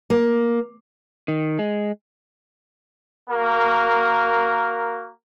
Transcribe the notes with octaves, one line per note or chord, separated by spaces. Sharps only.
A#3
D#3
G#3
A#3 F#4 A#4